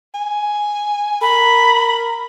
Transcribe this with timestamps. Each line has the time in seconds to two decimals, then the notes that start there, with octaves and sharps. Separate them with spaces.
0.14 G#5
1.22 A#4 B5